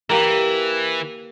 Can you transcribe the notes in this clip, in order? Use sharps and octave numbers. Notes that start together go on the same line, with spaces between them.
E3 A#3 G4 A#4